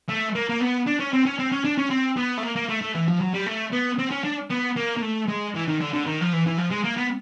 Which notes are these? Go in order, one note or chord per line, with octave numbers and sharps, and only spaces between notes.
A3
A#3
A#3
B3
D4
C#4
C4
C#4
C4
C#4
D4
C#4
C4
B3
A3
A#3
A#3
A3
A3
E3
F3
F#3
G3
A3
B3
C4
C#4
D4
B3
A#3
A#3
A3
G#3
E3
D#3
D3
D3
D#3
F3
E3
E3
F3
G#3
A#3
B3